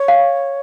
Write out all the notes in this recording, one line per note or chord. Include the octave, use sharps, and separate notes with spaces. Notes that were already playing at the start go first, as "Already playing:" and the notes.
Already playing: C#5
F5